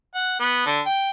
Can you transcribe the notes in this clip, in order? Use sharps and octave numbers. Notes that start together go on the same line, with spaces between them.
F#5
B3
D3
G5